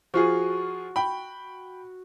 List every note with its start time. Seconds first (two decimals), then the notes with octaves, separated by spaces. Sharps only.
0.14 F3 F4 F#4 G#4
0.96 G5 B5